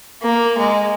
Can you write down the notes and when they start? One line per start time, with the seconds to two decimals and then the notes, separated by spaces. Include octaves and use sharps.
0.22 A#3
0.58 G#3